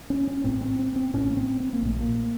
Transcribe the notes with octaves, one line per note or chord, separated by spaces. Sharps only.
C#4
C#4
A1 A2 C4
C4
C4
C4
A1 A2 C#4
A#3
C4
C4
A#3
A#1 A#2 A3
A#3